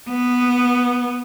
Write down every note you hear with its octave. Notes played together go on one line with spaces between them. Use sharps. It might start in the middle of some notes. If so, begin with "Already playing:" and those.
B3